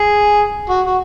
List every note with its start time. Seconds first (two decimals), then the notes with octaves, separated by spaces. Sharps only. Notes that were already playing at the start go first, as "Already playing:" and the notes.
Already playing: G#4
0.69 F#4
0.86 F#4